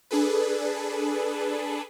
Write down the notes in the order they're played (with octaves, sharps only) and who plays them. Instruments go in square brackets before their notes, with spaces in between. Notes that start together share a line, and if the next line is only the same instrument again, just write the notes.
[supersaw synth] D4 G#4 A4 B4